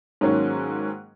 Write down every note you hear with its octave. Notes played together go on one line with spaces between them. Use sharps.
G#2 D#3 F#3 A#3 C#4